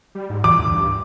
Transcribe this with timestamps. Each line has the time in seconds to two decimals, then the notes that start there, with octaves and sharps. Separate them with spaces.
0.15 G3
0.30 G#2
0.44 E3 D6
0.59 D2
0.71 G2